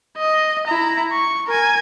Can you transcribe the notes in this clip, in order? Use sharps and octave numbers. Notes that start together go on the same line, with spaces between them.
D#5
E4 A#5
C#6
A#4 G#5